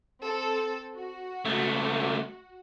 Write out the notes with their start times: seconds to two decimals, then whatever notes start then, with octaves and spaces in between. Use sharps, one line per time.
0.22 C4 A4
0.96 F#4
1.45 C#2 A3